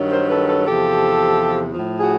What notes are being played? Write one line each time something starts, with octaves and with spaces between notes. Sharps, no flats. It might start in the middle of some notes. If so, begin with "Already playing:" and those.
Already playing: G2 D#3 F#3
A#4 C5
A4 B4
A4 B4
E2 C3 F3 G4 A4
A2 F3
F#4 G#4